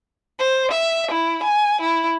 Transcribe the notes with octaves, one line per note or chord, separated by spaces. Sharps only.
C5
E5
E4
G#5
E4